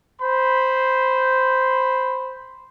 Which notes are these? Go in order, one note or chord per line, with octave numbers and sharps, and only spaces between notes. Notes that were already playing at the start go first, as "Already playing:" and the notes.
C5 B5